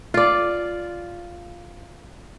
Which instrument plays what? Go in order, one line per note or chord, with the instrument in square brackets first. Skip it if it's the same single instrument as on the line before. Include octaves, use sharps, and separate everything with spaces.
[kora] F4 D5